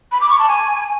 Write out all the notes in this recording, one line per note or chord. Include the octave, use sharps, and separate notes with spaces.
B5
D6
C#6
A5
G#5